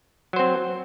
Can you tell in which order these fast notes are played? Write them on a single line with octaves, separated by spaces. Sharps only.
F#3 C5 C4